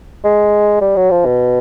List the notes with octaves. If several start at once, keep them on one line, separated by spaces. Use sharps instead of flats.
G#3
G3
F#3
F3
B2